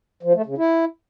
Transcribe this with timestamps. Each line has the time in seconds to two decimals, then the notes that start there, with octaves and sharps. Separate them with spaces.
0.23 F3
0.34 A3
0.46 C#3
0.58 E4